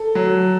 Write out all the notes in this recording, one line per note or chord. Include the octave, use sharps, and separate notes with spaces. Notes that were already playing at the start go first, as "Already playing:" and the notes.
Already playing: A4
F#3